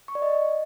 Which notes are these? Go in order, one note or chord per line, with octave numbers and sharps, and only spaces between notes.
C#6
D5
D#5